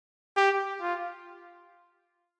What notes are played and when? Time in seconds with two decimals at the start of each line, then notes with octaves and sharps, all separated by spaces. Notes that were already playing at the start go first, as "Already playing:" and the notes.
0.36 G4
0.81 F4